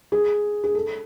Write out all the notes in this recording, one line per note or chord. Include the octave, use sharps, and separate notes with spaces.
G#4
G#4
A4